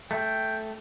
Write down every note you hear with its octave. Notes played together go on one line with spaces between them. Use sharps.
A3 G5